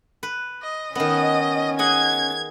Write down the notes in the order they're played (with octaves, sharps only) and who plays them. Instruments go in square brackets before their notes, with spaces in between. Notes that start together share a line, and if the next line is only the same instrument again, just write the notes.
[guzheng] B4
[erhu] D#5
[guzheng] D#3 B3 [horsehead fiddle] C#4 [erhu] D#5
[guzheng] G#4 D#5 F#5 [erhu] G#6